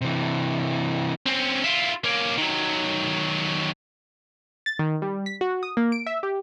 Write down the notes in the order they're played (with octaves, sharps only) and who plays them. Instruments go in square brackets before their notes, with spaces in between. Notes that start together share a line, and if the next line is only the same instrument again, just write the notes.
[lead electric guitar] C3 E3
[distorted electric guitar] C4 C#4
E4 F4
A#3 C#4
D#3 F#3
[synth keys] A6
D#3
G3
B6
F#4
D#6
A#3
D7
E5
G4